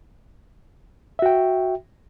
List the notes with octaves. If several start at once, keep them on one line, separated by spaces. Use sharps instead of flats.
F#4 E5 G5